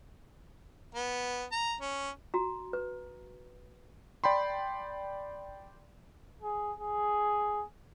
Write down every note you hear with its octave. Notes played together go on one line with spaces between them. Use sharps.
B3
A#5
C#4
F#4 A#5
B4
D5 G5 B5 C6
G#4
G#4